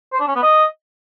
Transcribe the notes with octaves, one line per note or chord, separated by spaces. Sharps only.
C5
D4
C#4
B3
D#5